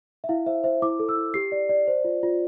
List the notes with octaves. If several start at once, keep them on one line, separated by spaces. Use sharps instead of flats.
E5
E4 F5
C5 E5
C5 E5
E4 D6
A4
E6
E4
G4 C7
D5
D5
C5
F4
F4